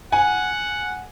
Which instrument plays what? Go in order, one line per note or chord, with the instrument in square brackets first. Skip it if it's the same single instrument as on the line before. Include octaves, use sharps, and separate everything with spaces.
[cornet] F#5 [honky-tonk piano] G#5